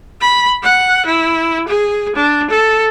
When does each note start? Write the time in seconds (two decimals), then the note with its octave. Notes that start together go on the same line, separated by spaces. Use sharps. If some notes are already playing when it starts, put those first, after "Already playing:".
0.21 B5
0.63 F#5
1.06 E4
1.68 G#4
2.16 D4
2.50 A4